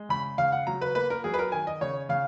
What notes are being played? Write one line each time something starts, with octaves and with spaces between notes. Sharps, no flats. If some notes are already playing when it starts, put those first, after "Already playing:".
Already playing: G#3
C#3 B5
C#3 F5
F#5
F#3 A#5
B4
A#3 B4
A#4
F#3 G#4
B4
A#4
D#3 G#5
D#5
C#3 C#5
C#3 F5